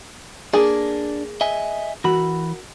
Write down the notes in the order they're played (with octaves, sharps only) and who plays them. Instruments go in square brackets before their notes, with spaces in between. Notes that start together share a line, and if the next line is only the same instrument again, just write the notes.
[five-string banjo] A#3 G#4 [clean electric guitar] D4
[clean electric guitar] D#5 E5 G#5
[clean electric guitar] E3 B5 [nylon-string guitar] F#4 A#4